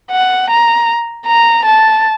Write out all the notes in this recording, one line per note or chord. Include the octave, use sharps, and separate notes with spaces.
F#5
A#5
A#5
A5